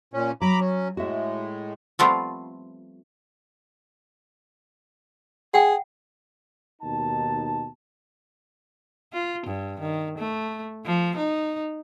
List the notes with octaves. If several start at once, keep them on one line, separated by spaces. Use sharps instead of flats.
A#2 C#4
F#3 A#5 B5 D6
C#4
A2 G#3 F#4 E5
F3 G3 A3 B3 C4 F4
G#4 F#5 G5
D#2 B2 D#4 A5
F4
G2
D#3
A3
F3
D#4